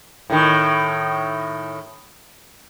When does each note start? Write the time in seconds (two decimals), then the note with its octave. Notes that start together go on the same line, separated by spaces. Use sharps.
0.30 A2 D#3